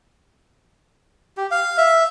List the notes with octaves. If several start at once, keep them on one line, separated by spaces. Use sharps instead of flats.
G4
F5
E5